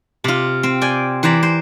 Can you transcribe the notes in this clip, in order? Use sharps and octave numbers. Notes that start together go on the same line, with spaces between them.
C3 F4
C4
D5 G5 G#5
E3 C5 D5 A#5 B5
C5